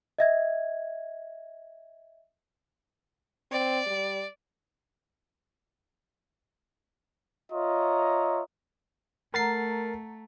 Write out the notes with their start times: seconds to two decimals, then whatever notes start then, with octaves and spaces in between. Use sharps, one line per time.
0.19 D#5 E5 G#6
3.52 C4 D5
3.86 G3
7.53 F4 C#5 D#5 E5 A#5
9.34 A3 A#4 F#5 A#5 A6 C7